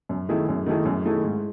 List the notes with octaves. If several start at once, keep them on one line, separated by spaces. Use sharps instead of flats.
F#2
D#3 A3 E4 G#4
F#2
D#3 A3 E4 G#4
F#2
D#3 A3 E4 G#4
G#2